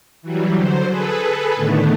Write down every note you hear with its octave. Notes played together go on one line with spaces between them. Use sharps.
E3 F#3 G3
D3 F#3 C5
G#4 A4 B4
A2 D3 D#3 A3 B3